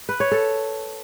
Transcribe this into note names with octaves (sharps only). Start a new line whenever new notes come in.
B4
C#5
A4